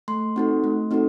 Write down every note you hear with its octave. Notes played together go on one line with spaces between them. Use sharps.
A3 C6
C4 D#4 F#4 A4
A3
C4 D#4 F#4 A4